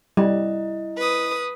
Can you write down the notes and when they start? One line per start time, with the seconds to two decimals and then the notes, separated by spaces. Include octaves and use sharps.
0.17 G3 E4 D#5
0.97 B4 D#6